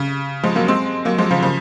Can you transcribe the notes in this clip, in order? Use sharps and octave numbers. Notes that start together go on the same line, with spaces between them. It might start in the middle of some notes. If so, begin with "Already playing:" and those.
Already playing: C#3
F3 G#3
F#3 A#3
G#3 C4
F#3 A#3
F3 G#3
C#3 F3
C#3 F3